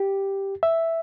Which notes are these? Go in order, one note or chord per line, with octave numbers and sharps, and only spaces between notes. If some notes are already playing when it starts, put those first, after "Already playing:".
Already playing: G4
E5